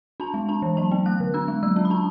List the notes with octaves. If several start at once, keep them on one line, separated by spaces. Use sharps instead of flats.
D4 A5
G#3
D4 A5
E3
F#3 A5
B3
A3 F#6
D3
D4 E6
G#3
F#3 E6
C#4
B5
D4 A5